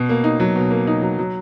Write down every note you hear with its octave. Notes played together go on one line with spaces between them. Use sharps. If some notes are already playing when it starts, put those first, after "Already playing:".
Already playing: B2
A#3
D#4
F#3
B2
A#3
D#4
F#3
F#3